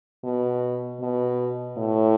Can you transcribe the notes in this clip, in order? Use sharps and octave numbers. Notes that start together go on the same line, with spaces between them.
B2
B2
A2